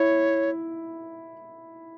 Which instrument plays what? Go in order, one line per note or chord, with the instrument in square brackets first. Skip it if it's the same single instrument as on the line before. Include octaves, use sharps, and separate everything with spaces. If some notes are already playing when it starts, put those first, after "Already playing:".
Already playing: [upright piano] E4 [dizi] C#5